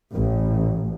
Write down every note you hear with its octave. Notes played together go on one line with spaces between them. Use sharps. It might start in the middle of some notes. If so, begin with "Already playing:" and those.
A1